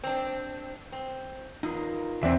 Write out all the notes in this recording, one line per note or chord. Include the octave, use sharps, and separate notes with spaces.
C4 D4
C4
E2 D#4 F4 A#4
E2 C4 G#4 D5 E5